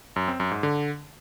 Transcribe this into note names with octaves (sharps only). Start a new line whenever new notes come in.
F#2
C4
F#2
G#2
D3